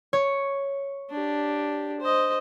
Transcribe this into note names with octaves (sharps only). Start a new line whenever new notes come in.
C#5
D4 G4
C5 D#5